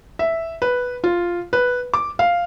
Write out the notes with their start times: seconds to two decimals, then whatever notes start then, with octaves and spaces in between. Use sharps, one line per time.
0.19 E5
0.62 B4
1.04 F4
1.53 B4
1.94 D6
2.19 F5